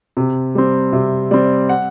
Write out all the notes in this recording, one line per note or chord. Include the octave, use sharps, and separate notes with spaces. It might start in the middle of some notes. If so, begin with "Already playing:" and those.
C3
G3 C4
C3 E5
G3 C4 D5
F#5